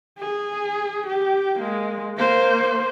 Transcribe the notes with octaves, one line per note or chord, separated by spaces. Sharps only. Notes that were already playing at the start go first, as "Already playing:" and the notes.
G#4
G4
G#3 A#3
A#3 C5